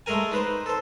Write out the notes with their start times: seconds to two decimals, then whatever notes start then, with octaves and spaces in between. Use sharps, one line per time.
0.06 G#3 A3 G#4 A#4 G#5
0.31 D#4 B4 C5
0.66 A4 C5